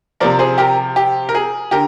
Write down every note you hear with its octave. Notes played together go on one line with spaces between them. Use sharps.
C3 F3 A#4 D5
G#4 C5
G4 A#4
G4
A#4
G#4
D3 G4 A#4